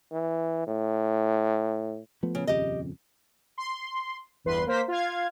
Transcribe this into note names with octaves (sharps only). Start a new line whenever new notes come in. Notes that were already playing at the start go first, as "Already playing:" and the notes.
E3
A2
F3 A3 B3
C#3
D#1 F2 C#3 G4 D#5
C6
G1 E2 B4 C6
A#3 A#4 C5 B6
F4 F5 G#6